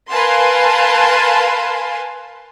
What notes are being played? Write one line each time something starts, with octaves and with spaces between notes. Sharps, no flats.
A#4 B4 F5 G#5 A5 C6